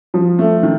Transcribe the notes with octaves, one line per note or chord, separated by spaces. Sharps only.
F3
A3
D#3